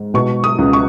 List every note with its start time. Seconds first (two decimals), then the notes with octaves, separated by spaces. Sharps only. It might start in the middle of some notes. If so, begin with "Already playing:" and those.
Already playing: G#2
0.14 B2 C#6
0.44 D#6
0.59 C#2
0.73 C#6